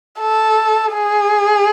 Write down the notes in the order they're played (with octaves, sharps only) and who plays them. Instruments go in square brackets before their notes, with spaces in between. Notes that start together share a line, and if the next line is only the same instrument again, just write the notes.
[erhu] A4
G#4